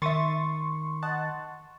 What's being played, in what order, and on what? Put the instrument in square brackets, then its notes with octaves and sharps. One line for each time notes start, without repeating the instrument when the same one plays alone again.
[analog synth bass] D#3 [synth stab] E5 D#6 A6 [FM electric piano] C6 C#6
[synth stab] D#5 F#5 A5